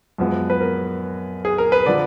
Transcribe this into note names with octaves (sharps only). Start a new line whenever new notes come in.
F#2 F3 G#3 B3
B4
A#4
G#4
A#4
B4
D3 F3 D5